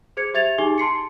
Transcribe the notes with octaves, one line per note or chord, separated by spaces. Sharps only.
G#4 C5 G#6 C#7
G4 E5 G#6 A6 F7
D#4 G4 G#4 G#5 G7
A5 C6 C7 C#7